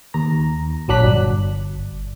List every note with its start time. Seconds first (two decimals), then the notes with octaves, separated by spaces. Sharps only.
0.14 D#2 A#5
0.88 A#1 F#3 D4 F#6 B6
1.04 G1